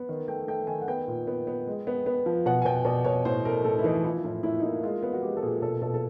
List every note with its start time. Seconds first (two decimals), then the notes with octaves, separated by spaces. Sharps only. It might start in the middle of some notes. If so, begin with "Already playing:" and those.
Already playing: B3
0.09 D#3
0.28 A3 G5
0.48 A3 G5
0.67 D#3 G#5
0.81 F#5
0.88 B3 G5
1.08 A#2
1.27 B3
1.47 B3
1.67 G#3
1.87 B3
2.06 B3
2.26 F3
2.46 B2 F#5
2.62 G#5
2.65 B2 G5
2.85 B2 D5
3.05 B2 C#5
3.25 A2 C5
3.45 A3 A#4
3.64 A2 A4
3.78 E4
3.84 E3 D#4
4.04 F3 E4
4.24 A2 F4
4.43 A2 E4
4.59 D#4
4.63 A#3 E4
4.83 G#3 F4
5.03 B3
5.13 F#4
5.23 G#3 G4
5.37 A4
5.43 A#2 G#4
5.62 B2 A4
5.81 B2 A4
5.94 A4